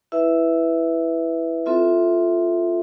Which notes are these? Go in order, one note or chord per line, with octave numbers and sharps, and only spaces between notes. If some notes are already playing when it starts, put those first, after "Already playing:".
E4 B4 E5
C4 F4 A4 E5